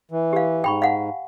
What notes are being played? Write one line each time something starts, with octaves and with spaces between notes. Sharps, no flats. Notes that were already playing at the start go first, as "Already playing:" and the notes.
E3
G4 F5
G#2 G5 B5 C#6
F5 F#5 G#5